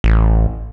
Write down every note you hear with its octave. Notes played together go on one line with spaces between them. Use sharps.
A1